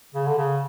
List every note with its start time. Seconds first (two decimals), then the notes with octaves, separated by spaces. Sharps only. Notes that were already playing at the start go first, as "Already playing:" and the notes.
0.14 C#3
0.26 D3
0.38 C#3